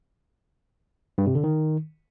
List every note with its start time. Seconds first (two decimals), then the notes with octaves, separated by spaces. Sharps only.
1.18 G2
1.27 C3
1.35 D3
1.44 D#3